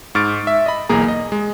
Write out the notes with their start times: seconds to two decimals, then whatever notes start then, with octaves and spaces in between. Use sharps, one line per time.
0.15 G#2 C#6 F6 A6 D7
0.47 E5
0.66 D#5 B5
0.89 B1 E2 A#3 G#4 A#5
1.08 D#5
1.32 G#3